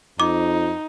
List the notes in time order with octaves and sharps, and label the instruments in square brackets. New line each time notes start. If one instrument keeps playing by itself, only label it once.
[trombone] F2 [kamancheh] D#4 [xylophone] D6